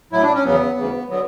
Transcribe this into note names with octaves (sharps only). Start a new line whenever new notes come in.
A2 F#3 E4
D4
C#4
E2 C#3 F#3 B3
D2 C#3 E3
D3 F#3 B3